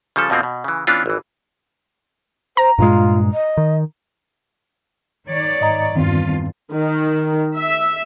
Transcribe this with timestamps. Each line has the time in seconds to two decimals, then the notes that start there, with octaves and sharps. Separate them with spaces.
0.16 C#3 F3 G3 A4
0.30 F2 B2 F3 A#3 C4
0.43 B2
0.64 C#3 E3
0.87 E3 B3 C#4 D4 F4
1.06 G#1 E3
2.57 C5 A#5
2.79 G2 A#2 G#3 F4
3.33 D#5
3.57 D#3
5.29 D#3 C#5 D5
5.61 G#2 D#5 A#5
5.95 E2 G2 D#3 C4 F4
6.72 D#3
7.57 E5